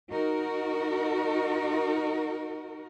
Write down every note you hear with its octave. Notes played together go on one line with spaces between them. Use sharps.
D#4 F#4 A#4